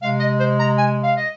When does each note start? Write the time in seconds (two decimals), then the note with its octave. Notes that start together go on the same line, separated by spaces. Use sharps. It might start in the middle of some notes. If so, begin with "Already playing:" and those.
0.01 C3 G#3 F5
0.20 D#5
0.40 C5
0.60 A#5
0.78 G#5
1.03 F5
1.17 D#5